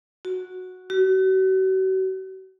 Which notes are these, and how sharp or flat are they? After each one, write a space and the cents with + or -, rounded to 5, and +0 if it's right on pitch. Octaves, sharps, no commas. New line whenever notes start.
F#4 -5
F#4 +40